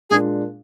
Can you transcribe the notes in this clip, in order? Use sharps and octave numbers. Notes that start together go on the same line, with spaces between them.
A#2 G#3 D4 G#4